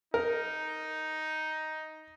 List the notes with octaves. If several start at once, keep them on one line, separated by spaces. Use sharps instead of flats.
D#4 A#4